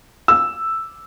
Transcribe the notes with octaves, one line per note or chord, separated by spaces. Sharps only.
E6